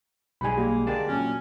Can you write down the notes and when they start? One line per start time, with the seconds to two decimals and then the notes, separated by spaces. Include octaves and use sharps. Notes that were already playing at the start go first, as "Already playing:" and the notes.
0.41 B1 G3 G#3 G#5 B5
0.58 A#3 G4
0.87 D3 G#3 A#3 D5 G5 A5
1.08 A#2 F#3 C#4